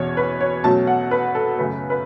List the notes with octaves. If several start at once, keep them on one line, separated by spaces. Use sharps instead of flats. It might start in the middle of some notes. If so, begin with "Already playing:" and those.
Already playing: E2 B2 C#4 C#5
B4
C#5
B2 F#3 A3 C#4 A5
F#5
B4
A4
F#2 C#3 A3 B4
B4